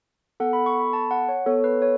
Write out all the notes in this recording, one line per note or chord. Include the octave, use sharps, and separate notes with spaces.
B3 A4 F#5
B5
C#6
B5
A5
F#5
C#5
B3 A4 C#5
B4
C#5